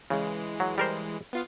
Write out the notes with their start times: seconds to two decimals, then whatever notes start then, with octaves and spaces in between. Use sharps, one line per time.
0.10 C#3 E3 G#3
0.60 F#3
0.78 G3 A#4 C5
1.33 B3 F4 F5